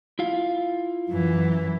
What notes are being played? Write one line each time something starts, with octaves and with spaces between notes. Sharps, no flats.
E4 F4 F5
F#2 E3